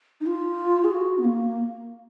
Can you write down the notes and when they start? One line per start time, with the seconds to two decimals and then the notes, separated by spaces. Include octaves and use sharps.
0.21 D#4
0.26 F4
0.84 G#4
0.92 F#4
1.18 B3
1.25 A#3